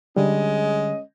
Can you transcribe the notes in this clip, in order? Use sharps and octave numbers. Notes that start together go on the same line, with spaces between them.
D3 G3 G#3 C#4 D#5